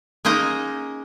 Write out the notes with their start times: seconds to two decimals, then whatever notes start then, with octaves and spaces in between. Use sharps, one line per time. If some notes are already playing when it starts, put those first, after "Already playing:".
0.25 G#3 A#3 C#4 D#4 D#5